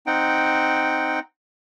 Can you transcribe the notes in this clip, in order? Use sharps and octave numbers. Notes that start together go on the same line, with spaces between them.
C4 D#4 F#5 G5